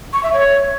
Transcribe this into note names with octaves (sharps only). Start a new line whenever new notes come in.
C#6
E5
C#5